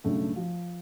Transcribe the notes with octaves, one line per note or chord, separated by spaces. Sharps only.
B1 G2 C#3 A3
F3